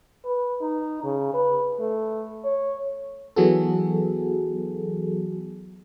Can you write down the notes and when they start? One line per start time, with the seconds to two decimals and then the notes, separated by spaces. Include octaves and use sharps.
0.25 B4
0.62 D#4
1.03 C#3
1.34 B4
1.79 A3
2.44 C#5
3.36 E3 F#3 B3 F#4 G#4 A4